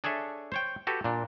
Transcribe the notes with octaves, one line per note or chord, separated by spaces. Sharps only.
D4 G#4 A4 C#5 E5
C5 C#5 G5
F#4 G4 A4 B4
A#2 D4